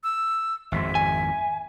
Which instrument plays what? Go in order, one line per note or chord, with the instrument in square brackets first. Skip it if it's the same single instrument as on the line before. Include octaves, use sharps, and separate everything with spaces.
[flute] E6
[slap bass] G#1 F2 G#3 [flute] E5
[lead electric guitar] G#5